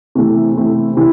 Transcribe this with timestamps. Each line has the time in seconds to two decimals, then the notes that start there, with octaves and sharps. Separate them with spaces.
0.15 C3 E3 A3 C4 E4
0.56 C3 E3 A3 C4 E4
0.97 C3 E3 C4 E4